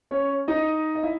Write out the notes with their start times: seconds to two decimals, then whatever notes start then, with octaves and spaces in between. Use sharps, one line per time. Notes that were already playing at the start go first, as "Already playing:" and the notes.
0.11 C#4 C#5
0.48 D#4 D#5
0.95 D#5
1.03 E4 E5